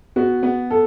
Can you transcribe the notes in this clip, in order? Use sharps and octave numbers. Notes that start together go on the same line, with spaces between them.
B3 F#4
B3
A4